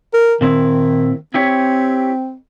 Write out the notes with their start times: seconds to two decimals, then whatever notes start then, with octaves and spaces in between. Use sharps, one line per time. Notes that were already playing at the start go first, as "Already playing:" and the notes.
0.14 A#4
0.41 A#2 D#3 C4 E4
1.34 C4 E4 G4 C#5